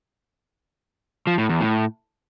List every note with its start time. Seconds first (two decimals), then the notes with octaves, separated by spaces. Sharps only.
1.27 F3
1.38 A2
1.50 E2
1.61 A2